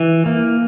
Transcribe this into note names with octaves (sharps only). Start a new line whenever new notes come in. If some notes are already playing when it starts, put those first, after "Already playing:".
Already playing: E3
A#3